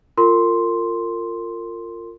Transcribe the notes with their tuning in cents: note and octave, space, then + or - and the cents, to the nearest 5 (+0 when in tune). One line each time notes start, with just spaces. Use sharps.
F4 +0 A#4 -35 C6 +0